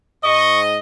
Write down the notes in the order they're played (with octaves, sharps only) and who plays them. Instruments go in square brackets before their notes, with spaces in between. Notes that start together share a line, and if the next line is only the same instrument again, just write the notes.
[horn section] G#2 D#5 [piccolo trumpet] C#6